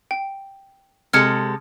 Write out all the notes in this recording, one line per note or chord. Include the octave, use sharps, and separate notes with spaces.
G5
C3 G#3 A4 F6 G#6 C#7